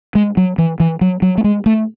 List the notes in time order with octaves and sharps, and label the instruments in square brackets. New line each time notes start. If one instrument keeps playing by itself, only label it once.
[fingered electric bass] G#3
F#3
E3
E3
F#3
F#3
A3
G#3
A3